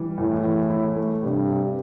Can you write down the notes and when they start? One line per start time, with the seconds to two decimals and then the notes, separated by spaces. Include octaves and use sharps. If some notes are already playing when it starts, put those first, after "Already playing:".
Already playing: E3 G3
0.18 E2 A2
0.44 E2
0.70 E4
0.96 A3
1.22 G2 C3
1.48 C3